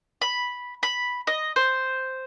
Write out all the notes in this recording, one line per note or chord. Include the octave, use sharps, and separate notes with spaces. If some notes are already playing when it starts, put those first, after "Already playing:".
B5
B5
D#5
C5